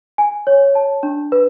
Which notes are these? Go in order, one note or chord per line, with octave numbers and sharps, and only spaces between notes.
G#5
C#5
A5
D4
B4